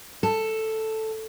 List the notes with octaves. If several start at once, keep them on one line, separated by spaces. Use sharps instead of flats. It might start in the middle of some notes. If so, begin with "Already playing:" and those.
A4